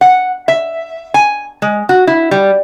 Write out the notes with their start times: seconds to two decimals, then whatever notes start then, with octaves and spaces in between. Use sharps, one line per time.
0.01 F#5
0.48 E5
1.14 G#5
1.62 G#3
1.89 F#4
2.07 E4
2.31 G3